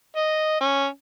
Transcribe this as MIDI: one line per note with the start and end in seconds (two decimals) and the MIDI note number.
0.17 0.61 75
0.61 0.87 61